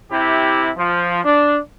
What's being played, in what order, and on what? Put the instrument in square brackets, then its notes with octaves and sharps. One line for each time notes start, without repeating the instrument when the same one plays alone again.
[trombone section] C3 E4 G4
F3
D4